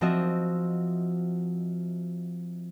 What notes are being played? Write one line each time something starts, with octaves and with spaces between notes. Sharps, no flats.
F3 C4 F4 F#4 D#5 E5